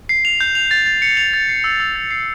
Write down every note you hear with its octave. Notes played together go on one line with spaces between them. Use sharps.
C7
F7
G6
F7
A6
A6
C#7
F7
A6
C7
E6
E6
A6
C7